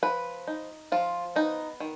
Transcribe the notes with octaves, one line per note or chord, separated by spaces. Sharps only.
F3 B4
D#4
F3 F4
B3 D#4
D#3